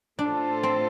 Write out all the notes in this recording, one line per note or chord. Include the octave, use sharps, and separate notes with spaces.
A2 A3 D4 F4 A4 C5
C4